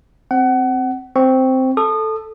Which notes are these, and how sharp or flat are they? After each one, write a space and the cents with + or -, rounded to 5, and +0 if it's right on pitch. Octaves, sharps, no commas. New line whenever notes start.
C4 +0 F#5 +25
C4 +0 C#6 +0
A4 +0 D#6 -30